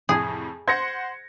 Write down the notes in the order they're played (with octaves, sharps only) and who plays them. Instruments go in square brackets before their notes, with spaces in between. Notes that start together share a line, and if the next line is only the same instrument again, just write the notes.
[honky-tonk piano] F2 A2 C3 [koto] G#4
[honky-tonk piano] C5 F#5 C6 [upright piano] G#6 A#6 C#7